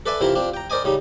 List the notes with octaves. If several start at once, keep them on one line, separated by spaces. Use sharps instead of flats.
A4 B4 D5 E5 G#5
C3 E3 E4 F4 A#4
C4 D4 F4
G5 A#5
A#4 C5 D5 D#5 G#5
C#3 G3 D#4